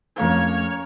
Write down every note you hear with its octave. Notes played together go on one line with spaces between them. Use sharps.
F2 A3 A#3 C#4 C#5 F5